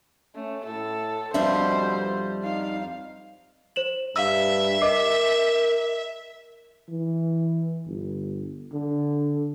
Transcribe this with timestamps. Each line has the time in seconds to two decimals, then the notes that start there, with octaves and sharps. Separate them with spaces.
0.36 A3 C#4
0.66 A2 A4
1.34 F2 B2 G3 D4 C5 E5
2.44 D#4 F5
3.76 C5 E7 F#7
4.16 G2 E5 F5 E6
4.81 A#4 D#5 D6 C7
6.89 E3
7.87 G1
8.72 D3